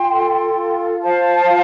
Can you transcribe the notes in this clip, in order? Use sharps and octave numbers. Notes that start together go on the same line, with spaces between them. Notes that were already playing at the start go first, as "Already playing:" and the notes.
Already playing: F4 G5 C6
A4
F4
C5 F5 A5
F4